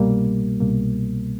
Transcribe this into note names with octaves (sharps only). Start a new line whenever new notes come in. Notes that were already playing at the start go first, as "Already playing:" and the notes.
Already playing: C2 B2 G3 A#3
C2 B2 G3 A#3